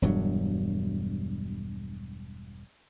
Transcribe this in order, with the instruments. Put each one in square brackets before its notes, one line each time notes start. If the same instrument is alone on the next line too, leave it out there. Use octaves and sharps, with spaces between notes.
[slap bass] E1 G2 F#3